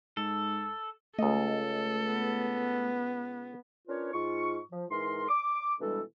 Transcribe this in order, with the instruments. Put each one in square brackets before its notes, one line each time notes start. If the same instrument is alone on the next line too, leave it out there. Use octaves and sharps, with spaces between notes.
[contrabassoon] G#2 [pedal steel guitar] A4
[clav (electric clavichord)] C#2 D#5 [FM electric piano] A3 [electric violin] A4
[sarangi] B3
[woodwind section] C#4 D4 F4 A#4 B4 C#5
G#2 F4 C#6
F3
G#2 E3 A#4 C6
D6
B2 E3 G3 G#3 D4 A4